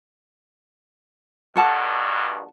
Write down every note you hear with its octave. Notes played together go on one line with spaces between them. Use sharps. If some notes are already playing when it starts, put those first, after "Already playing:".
A#1 G2 B2 A4 F#5 A5